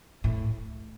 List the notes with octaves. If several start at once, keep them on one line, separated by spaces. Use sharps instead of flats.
A2